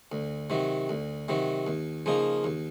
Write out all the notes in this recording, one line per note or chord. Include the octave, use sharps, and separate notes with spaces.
D2
C3 D#3 F#3
D2
C3 D#3 F#3
D#2
C#3 F3 A#3 D#4
D#2